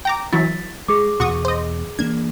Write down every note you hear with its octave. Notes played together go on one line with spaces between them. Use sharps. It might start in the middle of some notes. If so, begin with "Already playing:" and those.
G5 A#5 D6
E3 F#3 E4 A6 B6
G#3 G#4 D6
E2 B2 F#4 C#6 D#6
C5 D#5
E3 A#3 D4 G#6